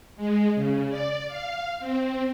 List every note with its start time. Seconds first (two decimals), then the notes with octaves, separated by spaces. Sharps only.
0.17 G#3
0.55 C#3
0.90 D5
1.28 F5
1.80 C4